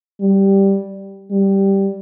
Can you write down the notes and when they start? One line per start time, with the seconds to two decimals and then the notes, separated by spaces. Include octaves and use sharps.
0.21 G3
1.31 G3